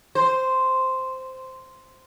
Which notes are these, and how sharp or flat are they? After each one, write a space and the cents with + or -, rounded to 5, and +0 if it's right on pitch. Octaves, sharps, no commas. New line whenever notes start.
C5 -5